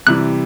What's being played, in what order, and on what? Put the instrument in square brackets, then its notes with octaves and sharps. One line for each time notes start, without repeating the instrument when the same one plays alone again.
[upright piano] C3 E3 G3 [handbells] F#6